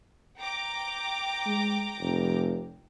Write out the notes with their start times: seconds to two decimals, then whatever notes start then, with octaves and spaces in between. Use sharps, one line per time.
0.39 G5 A#5 D6
1.46 G#3
1.99 F1